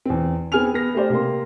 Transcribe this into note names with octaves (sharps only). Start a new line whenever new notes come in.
E2 C4
B3 C4 G#4 G#5 F6 F7
B3 A#6
A3 G4 C5 D5
C3 A#3 C6